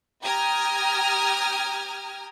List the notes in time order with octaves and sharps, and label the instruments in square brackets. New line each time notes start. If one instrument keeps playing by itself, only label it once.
[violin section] G4 G5 A#5 D#6 F6 G#6